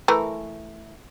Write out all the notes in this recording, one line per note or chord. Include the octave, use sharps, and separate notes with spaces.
E3 A3 A#4